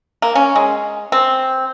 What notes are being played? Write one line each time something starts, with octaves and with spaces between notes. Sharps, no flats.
A#3
C#4
G#3
C4